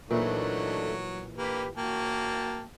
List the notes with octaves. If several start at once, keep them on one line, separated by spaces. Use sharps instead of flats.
A#2 E3 F#3 A3 D4 D#4
A#3 G4 B4
A#3 F#4 G5 A5